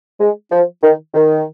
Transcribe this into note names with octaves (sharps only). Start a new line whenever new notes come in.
G#3
F3
D#3
D#3